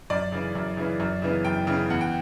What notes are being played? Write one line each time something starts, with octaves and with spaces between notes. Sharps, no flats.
F#2 D5
C#3 E3
F#2
C#3 E3
F#2
C#3 E3 B3
F#2 G5
C#3 E3 B3
E2 F#5
G5